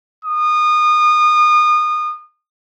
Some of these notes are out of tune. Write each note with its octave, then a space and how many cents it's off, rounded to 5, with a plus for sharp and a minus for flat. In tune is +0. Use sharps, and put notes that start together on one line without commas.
D#6 -30